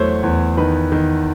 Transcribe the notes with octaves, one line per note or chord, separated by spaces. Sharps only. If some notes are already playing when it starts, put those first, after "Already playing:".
Already playing: E2 F#3 A3 C5 C#5
E2
D#3 B4
D#3